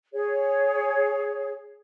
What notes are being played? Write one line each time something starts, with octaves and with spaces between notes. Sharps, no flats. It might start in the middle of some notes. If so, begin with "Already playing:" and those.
G#4 C#5